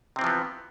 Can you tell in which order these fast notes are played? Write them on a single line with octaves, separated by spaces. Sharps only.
C3 C4 E3 F3 B3